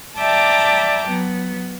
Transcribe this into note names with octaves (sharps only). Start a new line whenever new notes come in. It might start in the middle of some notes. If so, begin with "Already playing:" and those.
D5 E5 G5 A5 A#5 D6
F#3 B3